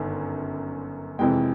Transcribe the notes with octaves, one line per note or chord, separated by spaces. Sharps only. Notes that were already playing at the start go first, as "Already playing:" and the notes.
Already playing: G1 F#2 D#3 G#5
F2 C3 E3 G#3 G5